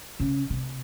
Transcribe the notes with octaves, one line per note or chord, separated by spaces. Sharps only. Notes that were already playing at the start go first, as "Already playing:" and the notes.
C#3
C3